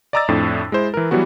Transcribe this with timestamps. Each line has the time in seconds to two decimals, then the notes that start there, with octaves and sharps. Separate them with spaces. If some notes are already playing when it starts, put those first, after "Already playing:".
0.13 D5 D#5 A#5 D6 E6 A6
0.28 F2 A2 D4
0.72 G#3 E4 C5
0.94 E3 A#4
1.11 E3 F#3 G3 B3 F#4